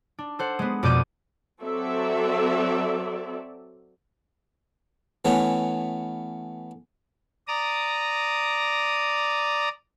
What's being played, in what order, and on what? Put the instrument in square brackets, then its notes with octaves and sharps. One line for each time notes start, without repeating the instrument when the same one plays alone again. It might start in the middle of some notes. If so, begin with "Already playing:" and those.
[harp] D4
A4 C5 F#5
G#3 B3
F2 B2 D5 D6 G6 D#7
[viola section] F#3 C4 A4 D5 E5
[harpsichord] E3 A3 B3 C#4
[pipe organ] D5 A#5 D#6